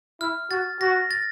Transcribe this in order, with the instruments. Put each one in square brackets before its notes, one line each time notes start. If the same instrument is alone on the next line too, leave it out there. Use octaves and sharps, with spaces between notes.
[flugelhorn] E4 [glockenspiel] F6
[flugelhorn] F#4 [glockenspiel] A6
[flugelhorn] F#4 [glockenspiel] A#6
[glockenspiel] A6